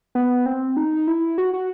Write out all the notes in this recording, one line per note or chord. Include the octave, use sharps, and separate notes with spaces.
B3
C4
D#4
E4
F#4
F#4